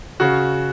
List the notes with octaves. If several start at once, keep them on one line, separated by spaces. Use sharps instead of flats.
C#3 F#4